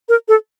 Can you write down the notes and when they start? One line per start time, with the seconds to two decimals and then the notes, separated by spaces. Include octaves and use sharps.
0.09 A#4
0.28 A4